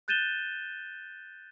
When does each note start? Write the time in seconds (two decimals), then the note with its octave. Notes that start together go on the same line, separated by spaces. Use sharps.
0.08 F#6 G6 A6 D#7 E7 G7